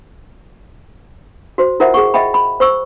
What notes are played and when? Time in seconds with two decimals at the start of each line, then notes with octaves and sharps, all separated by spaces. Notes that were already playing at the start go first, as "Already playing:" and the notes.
1.58 F#4 C5
1.80 E4 F4 A#4 C5 E5 F#5
1.94 G#4 F#5 C#6
2.14 D#5 E5 F#5 G5 B5
2.34 B5
2.60 C5 C#6 E6